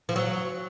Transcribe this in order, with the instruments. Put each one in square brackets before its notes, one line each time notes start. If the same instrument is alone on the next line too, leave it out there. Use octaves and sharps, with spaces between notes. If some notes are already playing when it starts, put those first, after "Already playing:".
[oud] F3
F#3